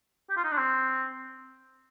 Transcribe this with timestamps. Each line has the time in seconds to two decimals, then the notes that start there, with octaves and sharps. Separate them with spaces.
0.30 G4
0.37 F4
0.44 D#4
0.51 D4
0.58 C4